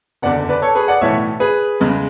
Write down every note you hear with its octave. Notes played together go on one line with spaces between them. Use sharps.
F#1 E2 D3 D5 F#5
B4 D5
A4 C#5
G#4 B4
D5 F#5
B1 A2 E3 A3 C#5 E5
G#4 B4
E2 C#3 G#3